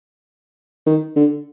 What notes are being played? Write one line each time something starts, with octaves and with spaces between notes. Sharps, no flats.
D#3
D3